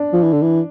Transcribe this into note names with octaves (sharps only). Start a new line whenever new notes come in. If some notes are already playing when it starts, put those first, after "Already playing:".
Already playing: D4
F3
E3
D3
E3